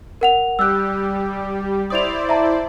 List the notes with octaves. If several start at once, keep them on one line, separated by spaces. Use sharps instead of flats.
A#4 F#5 F7
G3 G4 E6 F#6
E4 C5 D5 D#6 F7
E5 A5 A#5